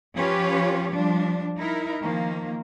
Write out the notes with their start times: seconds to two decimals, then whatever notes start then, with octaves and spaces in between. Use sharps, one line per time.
0.15 F3 C#4 F4 G4 B4 C#5
0.92 F3 G3 D4
1.57 D#4 E4 A#4
2.02 D#3 F3 A#3